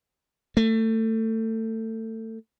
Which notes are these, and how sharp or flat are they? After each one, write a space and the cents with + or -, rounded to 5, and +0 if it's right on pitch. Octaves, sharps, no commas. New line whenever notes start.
A3 +25